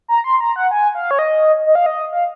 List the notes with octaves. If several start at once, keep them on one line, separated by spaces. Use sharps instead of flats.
A#5
C6
A#5
F#5
G#5
F5
C#5
D#5
D#5
F5
D#5
F5